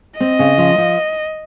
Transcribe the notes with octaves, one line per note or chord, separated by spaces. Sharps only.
C4 D#5
C#3
F3
F3